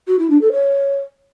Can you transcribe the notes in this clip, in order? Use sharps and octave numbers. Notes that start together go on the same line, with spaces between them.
F#4
E4
D4
A4
C#5